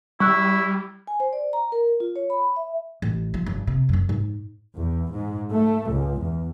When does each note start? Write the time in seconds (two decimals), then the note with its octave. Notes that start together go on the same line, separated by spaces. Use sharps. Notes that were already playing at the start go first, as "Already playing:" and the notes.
0.20 G3 E4 C#6 E6 F#6
1.07 G#5
1.20 C5
1.33 D5
1.53 A#5
1.72 A#4
2.00 F4
2.16 C#5
2.30 B5
2.56 E5
3.02 A1
3.34 F3
3.46 G1
3.67 C3
3.89 F#2 D4
4.09 G#2
4.76 E2
5.11 G#2
5.51 A3
5.92 C#2
6.21 E2